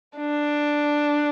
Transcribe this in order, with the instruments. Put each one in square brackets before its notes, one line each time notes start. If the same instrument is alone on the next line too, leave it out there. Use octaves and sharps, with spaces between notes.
[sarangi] D4